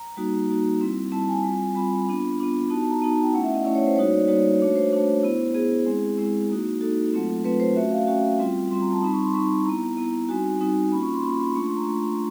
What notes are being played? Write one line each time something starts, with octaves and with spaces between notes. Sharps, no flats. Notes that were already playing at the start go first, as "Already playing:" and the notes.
Already playing: A#5
G3 A#3 D#4 F#4
G3 A#3 D#4 F#4
G3 C4 E4
G3 C4 E4 A5
G#5
G3 C4 F4
G3 C4 F4 B5
B3 D4 F4
B3 D4 F4
B3 D#4 F#4 A5
A5
A#5
B3 D#4 F#4 A5
A5
G5
A3 C#4 E4 F#5
E5
D#5
A3 C#4 E4 D5
C#5
C5
G3 A#3 D#4 F#4 C#5
D5
D5
G3 A#3 D#4 F#4 C#5
D5
A3 D4 F#4 C#5
C5
A3 D4 F#4 C5
B3 E4
B3 E4 G#4
G#3 C4 E4
G#3 C4 E4
A#3 D#4 F#4
A#3 D#4 F#4 A4
F#3 A3 C4 F4
F#3 A3 C4 F4 B4
C5
A3 C#4 F#4 E5
F5
A3 C#4 F#4 G5
G3 C4 F4
G3 C4 F4 C6
A#5
A5
G3 C4 D#4 B5
C#6
C6
G3 C4 D#4 C#6
B3 E4 A#5
B3 E4
G3 C4 D#4 F#4 G#5
G3 C4 D#4 F#4
A#3 C#4 F4 B5
C#6
C6
A#3 C#4 F4 B5
B5
A3 D4 F4 C#6
C6
A#5
A3 D4 F4